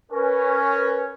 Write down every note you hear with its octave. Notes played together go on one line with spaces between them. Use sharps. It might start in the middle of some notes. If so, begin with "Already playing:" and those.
C#4 A#4 B4